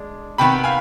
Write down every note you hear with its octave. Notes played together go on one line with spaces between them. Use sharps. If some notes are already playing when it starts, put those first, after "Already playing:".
Already playing: G#3 D4
C3 D#3 B3 G5 B5
F5 G#5